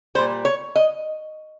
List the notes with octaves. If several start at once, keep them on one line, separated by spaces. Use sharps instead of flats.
A#2 G3 C5
C#5
D#5